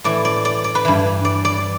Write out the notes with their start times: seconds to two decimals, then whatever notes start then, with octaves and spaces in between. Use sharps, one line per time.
0.04 A2 E3 D5
0.25 D5
0.45 D5
0.64 D5
0.75 B4
0.85 G2 E3
1.25 D5
1.45 D5